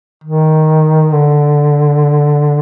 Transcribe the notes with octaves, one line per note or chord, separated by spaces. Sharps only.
D#3
D3